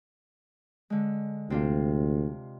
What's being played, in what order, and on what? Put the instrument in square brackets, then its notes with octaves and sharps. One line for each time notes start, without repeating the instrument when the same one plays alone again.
[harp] D3 G#3
[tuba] D2 [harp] C3 D4 F4